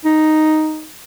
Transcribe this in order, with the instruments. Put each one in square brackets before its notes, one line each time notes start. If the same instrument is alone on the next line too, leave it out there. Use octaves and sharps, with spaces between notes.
[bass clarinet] D#4